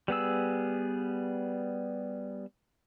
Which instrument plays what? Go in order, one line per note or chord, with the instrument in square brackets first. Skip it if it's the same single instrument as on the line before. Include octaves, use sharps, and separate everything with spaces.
[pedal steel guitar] G3 B3 G#4 E6